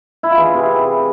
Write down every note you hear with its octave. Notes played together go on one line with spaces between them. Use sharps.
E4
F4
E3 G#4
C3